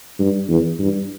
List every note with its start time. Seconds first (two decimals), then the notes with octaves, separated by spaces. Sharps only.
0.19 G2
0.49 E2
0.79 G2